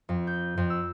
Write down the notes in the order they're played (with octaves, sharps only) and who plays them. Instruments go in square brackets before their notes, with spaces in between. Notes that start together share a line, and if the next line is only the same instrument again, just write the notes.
[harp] F2
G6
F2
E6